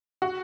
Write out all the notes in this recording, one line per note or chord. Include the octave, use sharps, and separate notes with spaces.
F#4